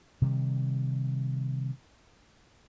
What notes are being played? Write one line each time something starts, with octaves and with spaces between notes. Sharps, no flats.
C3 D#3 G3